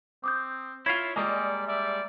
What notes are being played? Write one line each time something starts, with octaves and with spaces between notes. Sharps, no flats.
C4 D6 D#6 G6
E4 F4 C#5 G#6 C7
G3 G#3 A#3 D5 D#5 G#5
D5 E5